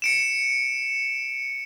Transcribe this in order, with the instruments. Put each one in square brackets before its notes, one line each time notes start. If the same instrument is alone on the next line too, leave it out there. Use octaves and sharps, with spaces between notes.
[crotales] C#7 D7 E7